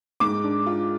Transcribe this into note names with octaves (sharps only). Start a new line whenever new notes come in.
G#2 D6
D4
F4